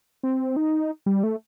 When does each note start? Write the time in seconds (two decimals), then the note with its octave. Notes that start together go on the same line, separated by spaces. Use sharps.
0.23 C4
0.56 D#4
1.06 G3
1.23 A3